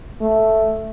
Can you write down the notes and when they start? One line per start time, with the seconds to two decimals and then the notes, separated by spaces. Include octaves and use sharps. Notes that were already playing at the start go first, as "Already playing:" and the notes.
0.21 A3